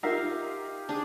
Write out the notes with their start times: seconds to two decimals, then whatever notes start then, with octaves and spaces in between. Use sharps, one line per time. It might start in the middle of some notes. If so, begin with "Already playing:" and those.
0.03 D#4 F4 G4 A#4 E5 F5
0.89 D4 G#4